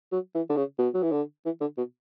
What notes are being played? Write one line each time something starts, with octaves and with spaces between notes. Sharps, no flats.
F#3
E3
D3
C#3
B2
F#3
E3
D3
E3
D3
B2